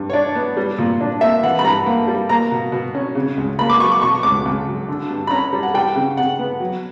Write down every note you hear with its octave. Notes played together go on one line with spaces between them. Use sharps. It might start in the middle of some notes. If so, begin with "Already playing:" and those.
Already playing: G2
C#5
D4 D5
B3
G3
A#2
D4
A#3 E5
E3 F#5
B5
G2 A#5
A#3
G3
A#3 A#5
B2
B2
C#4
C#3
C#2
A#3 B5
D6
F#3 C#6
D6
B2 C#6
C#2 D6
C#2
F#3
D3
G2
B5
C#4 A#5
G3
F#5
G3 G5
C#3
C#3 F#5
B3
F#3